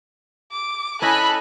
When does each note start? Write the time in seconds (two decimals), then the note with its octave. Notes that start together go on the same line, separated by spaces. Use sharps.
0.52 D6
1.02 C#4 E4 A4 D#5 G#5 B5 F#6